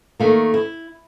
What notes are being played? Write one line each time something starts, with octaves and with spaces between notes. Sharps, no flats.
D#3 A3 A#3
E4